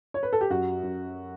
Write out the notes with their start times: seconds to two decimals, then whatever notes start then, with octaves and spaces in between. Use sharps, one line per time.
0.14 C#5
0.23 B4
0.33 A4
0.41 G4
0.50 F#2 F#4
0.83 F#2